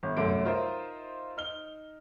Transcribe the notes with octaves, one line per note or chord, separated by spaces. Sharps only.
G1
C2 F#2 A3 C6 D6 D7
D#4 F4 A#4 C5 D#5 E5
D#4 F6 G7